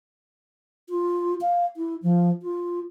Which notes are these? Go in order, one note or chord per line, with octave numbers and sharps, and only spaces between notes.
F4
F5
E4
F3
F4